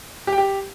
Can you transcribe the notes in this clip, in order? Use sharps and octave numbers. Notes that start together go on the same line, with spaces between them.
G4
G5
G4